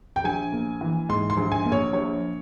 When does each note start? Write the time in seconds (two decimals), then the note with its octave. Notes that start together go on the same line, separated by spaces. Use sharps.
0.16 G5
0.24 A#1 G#5
0.52 A#3
0.81 E3
1.09 G#2 C6
1.30 C6
1.37 A#1
1.52 G#5
1.65 A#3
1.72 C#5
1.93 A#1 C#5